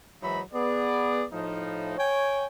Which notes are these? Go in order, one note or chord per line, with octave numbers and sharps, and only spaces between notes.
G#2 E3 F#3 D#4 E5 B5
B3 G#4 D5
A2 F3 D#4
C#5 G5 G#5